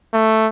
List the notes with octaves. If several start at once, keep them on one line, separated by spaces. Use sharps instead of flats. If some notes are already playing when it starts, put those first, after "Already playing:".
A3